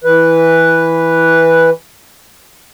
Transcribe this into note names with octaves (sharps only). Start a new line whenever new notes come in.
E3 B4